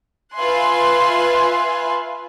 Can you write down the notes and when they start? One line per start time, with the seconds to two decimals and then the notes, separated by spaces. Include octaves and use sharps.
0.34 F4 B4 E5 G#5 C6 F#6